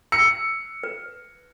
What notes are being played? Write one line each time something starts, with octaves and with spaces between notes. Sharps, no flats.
E6 C#7
B4